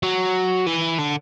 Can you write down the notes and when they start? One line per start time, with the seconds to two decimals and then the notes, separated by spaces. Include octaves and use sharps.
0.03 F#3
0.66 E3
0.98 D3